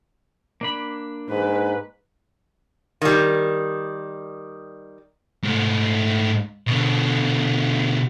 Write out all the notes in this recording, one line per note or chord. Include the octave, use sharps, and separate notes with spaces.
A#3 D4 B5
G#2 B4
D#3 G3
G#2 A3
B2 D3